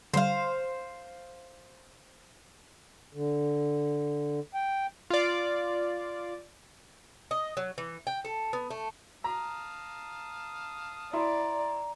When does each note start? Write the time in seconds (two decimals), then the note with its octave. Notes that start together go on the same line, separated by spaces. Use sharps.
0.14 D3 G3 C5 F5
3.14 D3
4.54 G5
5.10 F4 D5
7.31 D#5
7.57 F#3
7.78 E3
8.07 G5
8.25 A4
8.53 B3
8.70 A3
9.24 F5 A5 A#5 D#6
11.13 E4 D5 A#5 C6